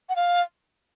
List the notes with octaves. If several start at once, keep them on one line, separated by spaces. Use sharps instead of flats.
F#5
F5